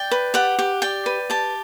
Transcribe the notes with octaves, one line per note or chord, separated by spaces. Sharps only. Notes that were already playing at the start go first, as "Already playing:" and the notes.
Already playing: D5 G5
B4
G4 F#5
G4
D5 G5
B4
G4 A5